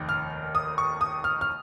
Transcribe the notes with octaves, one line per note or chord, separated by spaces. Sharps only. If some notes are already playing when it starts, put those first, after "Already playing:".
Already playing: F1 D#2 D#3
F6
D#6
C#6
D#6
F6
F6